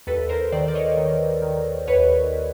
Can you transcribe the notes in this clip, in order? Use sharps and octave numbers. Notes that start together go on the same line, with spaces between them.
D#2 A4 B4
A#4 C5
D#3 C5 D5
D5
C#5 D#5
D#3
D#3
D#2 B4 C#5